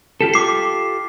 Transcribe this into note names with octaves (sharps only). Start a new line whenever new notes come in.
F4 G4 A4
D6 C7